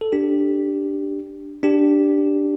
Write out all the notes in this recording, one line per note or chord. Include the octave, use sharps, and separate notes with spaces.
A4
D4 G4
D4 G4